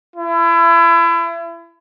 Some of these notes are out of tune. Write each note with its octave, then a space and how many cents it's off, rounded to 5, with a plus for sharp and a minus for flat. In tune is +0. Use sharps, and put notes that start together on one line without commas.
E4 +30